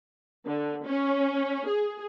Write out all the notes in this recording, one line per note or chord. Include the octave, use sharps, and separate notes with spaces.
D3
C#4
G#4